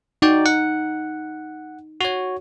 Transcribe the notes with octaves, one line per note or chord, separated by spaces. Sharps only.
D#4 F#4 D5 G5
F#5
F#4 C#5